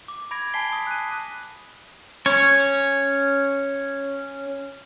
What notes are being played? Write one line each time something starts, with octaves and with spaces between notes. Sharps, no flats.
D6
B5 D6 G#6 A#6 D7
G#5 A5 B5 B6 C7 G7
D#6
F#6 D#7
C#4 C#5